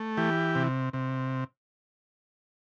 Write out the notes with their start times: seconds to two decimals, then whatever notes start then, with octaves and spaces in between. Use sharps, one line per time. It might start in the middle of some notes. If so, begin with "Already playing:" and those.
Already playing: A3
0.17 E3 G4
0.55 C3
0.93 C3